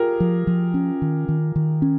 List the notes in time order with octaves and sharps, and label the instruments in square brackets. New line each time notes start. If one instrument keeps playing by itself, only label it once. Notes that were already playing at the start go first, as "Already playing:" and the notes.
Already playing: [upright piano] F4 G4 G#4 A#4
[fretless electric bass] F3
F3
C#4
D#3
D#3
D#3
C#4